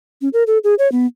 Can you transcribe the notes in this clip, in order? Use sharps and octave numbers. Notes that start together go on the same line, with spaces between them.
C#4
A#4
A4
G#4
C#5
B3